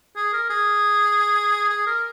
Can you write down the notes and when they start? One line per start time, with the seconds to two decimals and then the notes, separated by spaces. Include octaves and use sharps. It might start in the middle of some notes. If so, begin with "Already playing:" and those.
0.16 G#4
0.33 A#4
0.50 G#4
1.69 G#4
1.87 A#4